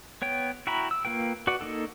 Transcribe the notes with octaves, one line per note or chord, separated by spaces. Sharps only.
B3 C#5 G5
E4 F#4 G5 A#5 B5
E6
A#3 F4 B4 G5
F#4 B4 D5 F#5
A#3 D#4 A4